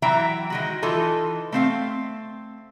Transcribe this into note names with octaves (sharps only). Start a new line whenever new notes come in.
E3 F#3 E5 G5 A#5
D#3 G#3 F#4
E3 D#4 F4 A4
A3 C4 F5